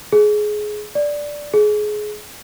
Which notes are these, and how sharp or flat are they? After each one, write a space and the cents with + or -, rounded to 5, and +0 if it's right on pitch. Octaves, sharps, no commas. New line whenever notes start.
G#4 +15
D5 -5
G#4 +20